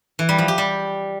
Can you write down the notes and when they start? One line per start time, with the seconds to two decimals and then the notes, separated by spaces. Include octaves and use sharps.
0.19 E3
0.29 G3
0.38 F3
0.48 G4
0.58 G3